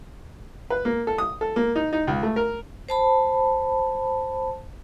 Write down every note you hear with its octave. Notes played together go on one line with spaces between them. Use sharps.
B4
A#3
A4
D#6
A4
A#3
D#4
D#4
C#2
A3
A#4
C5 A5 B5